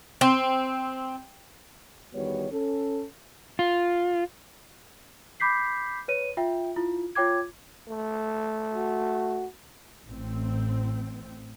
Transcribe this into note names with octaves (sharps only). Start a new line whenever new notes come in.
C4
E2 D#3 G3 B3 F#4 C#5
C#4 A4
F4
B5 D6 G6 B6 C7
B4 C#5 D#7
F4 E5 G5
E4 F4
F4 C#5 G5 D6 G#6
A3
F#4
A1 C4